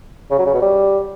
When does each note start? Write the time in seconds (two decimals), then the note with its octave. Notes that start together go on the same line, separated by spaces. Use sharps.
0.31 C#3
0.38 F#3
0.46 C#3
0.54 B2
0.62 G3